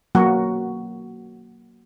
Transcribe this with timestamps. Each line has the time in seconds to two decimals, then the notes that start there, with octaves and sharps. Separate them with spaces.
0.15 F#3 A#3 F#4